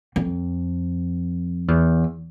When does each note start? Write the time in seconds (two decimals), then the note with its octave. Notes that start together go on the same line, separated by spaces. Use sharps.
0.16 F2
1.68 E2